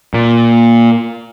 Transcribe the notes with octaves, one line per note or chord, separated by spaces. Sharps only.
A#2